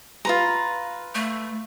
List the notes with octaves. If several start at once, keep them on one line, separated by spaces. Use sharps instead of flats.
F4 B4 A#5
A3